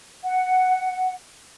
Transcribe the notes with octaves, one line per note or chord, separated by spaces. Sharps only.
F#5